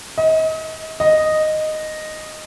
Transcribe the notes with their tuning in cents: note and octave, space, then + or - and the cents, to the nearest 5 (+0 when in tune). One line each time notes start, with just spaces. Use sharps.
D#5 +35
D#5 -5